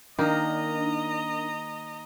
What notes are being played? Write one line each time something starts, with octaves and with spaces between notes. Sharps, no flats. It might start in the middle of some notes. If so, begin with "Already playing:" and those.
D#3 A#3 D4 D#4 A#4 D#5 A#5